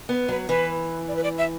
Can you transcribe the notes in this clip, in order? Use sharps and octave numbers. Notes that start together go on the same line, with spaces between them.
B3 B4
F#3 B4
E3 B4
D5
B4
D5
E5